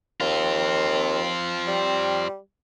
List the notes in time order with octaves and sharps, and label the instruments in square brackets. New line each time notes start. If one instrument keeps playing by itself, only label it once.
[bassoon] D#2 [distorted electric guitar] C4 F4
[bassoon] G3